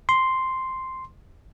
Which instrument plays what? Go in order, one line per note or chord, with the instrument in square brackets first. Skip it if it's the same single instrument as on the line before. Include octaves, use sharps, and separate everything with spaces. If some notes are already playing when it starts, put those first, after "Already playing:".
[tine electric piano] C6